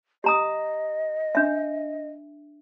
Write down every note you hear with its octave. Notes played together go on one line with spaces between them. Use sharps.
G4 D#5 A#5 D#6
D4 E5